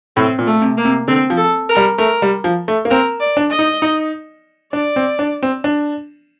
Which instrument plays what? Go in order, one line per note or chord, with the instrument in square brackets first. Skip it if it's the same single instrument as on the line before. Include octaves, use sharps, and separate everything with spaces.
[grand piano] A2 [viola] C4
[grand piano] A#2
[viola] A3
[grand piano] C3
[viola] A#3
[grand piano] C3
[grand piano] D3 [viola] C4
[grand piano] F3
[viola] A4
A#4
[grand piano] G3
[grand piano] A3 [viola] A#4
[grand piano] G3
F3
A3
A#3
[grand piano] C4 [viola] A#4
[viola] D5
[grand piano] D4
[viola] D#5
[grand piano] D#4
D#4
[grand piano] D4 [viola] D5
[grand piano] C4
D4
C4
D4